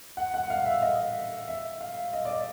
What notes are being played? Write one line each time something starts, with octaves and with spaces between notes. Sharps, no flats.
F#5
F#5
F5
E5
D#5
E5
F5
D#5
D5
D#5